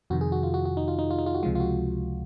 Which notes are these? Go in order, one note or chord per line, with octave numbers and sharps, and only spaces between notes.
F2 C3 D#3 F#4
G#4
F#4
F4
F#4
F#4
D#4
F4
D#4
F4
D#4
F4
F#4
C#2 C3 F3 G#3 F4
F4
F#4